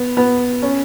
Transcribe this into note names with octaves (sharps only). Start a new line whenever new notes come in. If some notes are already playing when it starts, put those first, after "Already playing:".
Already playing: B3
B3
C#4